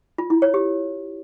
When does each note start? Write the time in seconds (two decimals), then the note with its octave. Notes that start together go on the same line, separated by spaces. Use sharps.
0.18 F4
0.30 E4
0.42 C#5
0.54 G4